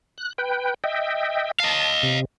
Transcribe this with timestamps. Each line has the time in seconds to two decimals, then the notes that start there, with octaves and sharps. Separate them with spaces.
0.18 F#6
0.38 B4 G5
0.84 D#5 E5 G5
1.60 D#5 F5 A5
2.03 C3